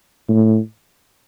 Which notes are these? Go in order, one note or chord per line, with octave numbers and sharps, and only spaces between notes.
A2